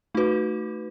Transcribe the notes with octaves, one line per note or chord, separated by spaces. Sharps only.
A3 D#4 F#4 B4